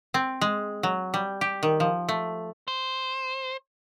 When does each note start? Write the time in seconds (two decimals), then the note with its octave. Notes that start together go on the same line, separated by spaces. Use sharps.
0.14 C4
0.41 G#3
0.83 F#3
1.14 G3
1.41 G4
1.63 D#3
1.80 F3
2.09 A3
2.68 C5